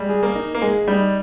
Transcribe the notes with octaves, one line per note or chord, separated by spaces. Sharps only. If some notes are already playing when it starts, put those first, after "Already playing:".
Already playing: G3 G#3
G#4
A#3
D#4
A#3
G#3 G#4
G3 D#4